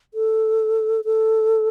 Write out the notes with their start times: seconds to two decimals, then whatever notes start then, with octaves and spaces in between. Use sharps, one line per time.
0.14 A4
1.05 A4